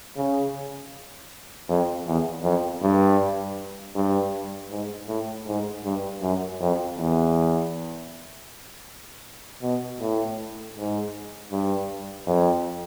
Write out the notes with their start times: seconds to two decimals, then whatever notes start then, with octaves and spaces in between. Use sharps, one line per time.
0.17 C#3
1.69 F2
2.06 E2
2.43 F2
2.82 G2
3.95 G2
4.70 G#2
5.08 A2
5.47 G#2
5.84 G2
6.21 F#2
6.60 F2
6.97 E2
9.62 B2
10.00 A2
10.76 G#2
11.52 G2
12.27 F2